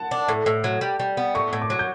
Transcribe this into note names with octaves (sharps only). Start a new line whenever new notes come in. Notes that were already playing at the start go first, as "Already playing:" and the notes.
Already playing: F#5 A5
D4
A2
A2
F#3
G3
G3
B3
A2 C#6
A2
D6
F#3
G6